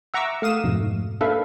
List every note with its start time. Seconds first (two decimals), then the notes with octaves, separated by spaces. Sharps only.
0.14 E5 F#5 A#5 C#6 D6 E6
0.42 A3 F5 D#6 E7
0.64 F2 G#2 B2
1.21 A#3 D4 A4 B4 E5 F5